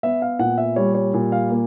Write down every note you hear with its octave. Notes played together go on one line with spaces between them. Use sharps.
B3 E5
F5
A#2 F#5
E5
G3 C#5
C#5
A#2
F5
A#3